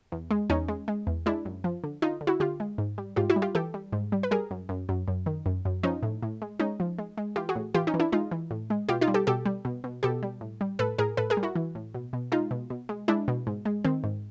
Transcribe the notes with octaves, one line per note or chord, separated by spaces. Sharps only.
E2
G#3
E2 C#4 D#4
G#3
G#3
E2
G#3 D4 E4
F#2
F3
D3
D3 D#4 F4
D3
E4 F#4
D3 F4 G4
G#3
G#2
G3
G#2 F4 G4
E4 F#4
G3
F4 G4
E3 G4 A4
G3
G#2
G3
B4
G3 G#4 A#4
F#2
F#2
F#2
F#2
D#3
F#2
F#2
F3 C#4 D#4
A2
A2
G#3
G#3 C#4 D#4
F3
G#3
G#3
E3 F4 G4
F#4 G#4
A2
E3 F4 G4
C#4 D#4
E3
D4 E4
G#3 D#4 F4
E3
A2
G#3
B2 F4 G4
D#4 F4
G3
G4 A4
B2 G4 A4
G3
B2
B2
B2 G4 A4
G3
A2
G3
A2 A4 B4
A2 G#4 A#4
A2 A4 B4
G#4 A#4
G3
E4 F#4
E3
A2
B2
B2
G#3 D#4 F4
B2
B2
G#3
G#3 D4 E4
B2
G#2
G#3
D#3 C4
G#2